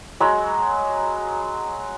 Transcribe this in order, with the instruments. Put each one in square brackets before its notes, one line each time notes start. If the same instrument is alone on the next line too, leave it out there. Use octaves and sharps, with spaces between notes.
[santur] F#3 G#3 B5